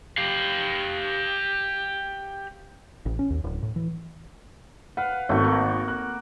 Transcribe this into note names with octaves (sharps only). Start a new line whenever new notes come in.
G4 F5
A1
C#4
D#2
D1
A2
E3
B4 F5 F#5
G#1 A3 F#4
A#3
F#6